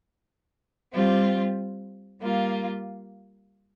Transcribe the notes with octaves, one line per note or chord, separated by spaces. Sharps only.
G3 C4 F4
G3 A#3 F4